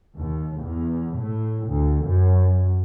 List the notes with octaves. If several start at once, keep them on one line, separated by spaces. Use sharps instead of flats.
D#2
E2
A2
D2
F#2